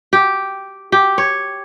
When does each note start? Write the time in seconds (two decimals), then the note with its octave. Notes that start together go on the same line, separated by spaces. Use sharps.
0.13 G4
0.92 G4
1.18 C#5